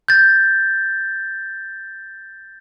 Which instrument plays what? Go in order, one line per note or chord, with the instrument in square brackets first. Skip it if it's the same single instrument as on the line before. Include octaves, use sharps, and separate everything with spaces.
[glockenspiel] G6 A6